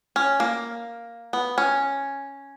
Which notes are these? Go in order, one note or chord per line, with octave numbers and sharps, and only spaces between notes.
C#4
A#3
B3
C#4